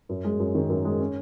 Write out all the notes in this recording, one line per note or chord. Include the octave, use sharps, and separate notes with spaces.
F#2
G#3
F#2
D#3
F#2
G#3
C#4